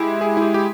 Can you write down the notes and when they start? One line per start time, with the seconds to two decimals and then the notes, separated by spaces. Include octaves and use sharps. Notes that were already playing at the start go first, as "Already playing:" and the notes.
Already playing: G#3 E4 G4
0.21 G#4
0.37 E4
0.42 G4
0.54 G4